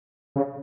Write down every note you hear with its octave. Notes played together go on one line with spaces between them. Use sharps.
C#3